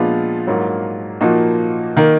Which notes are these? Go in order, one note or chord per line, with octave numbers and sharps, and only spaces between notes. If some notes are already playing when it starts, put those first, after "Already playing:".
Already playing: A#2 F3 G#3 B3 D4 F4
G#2 F#3 A#3
A#2 F3 A#3 D#4 F#4
D#3 A#3